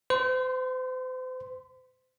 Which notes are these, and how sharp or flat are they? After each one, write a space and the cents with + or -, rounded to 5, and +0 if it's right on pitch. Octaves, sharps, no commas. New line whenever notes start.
C5 -40 C6 +0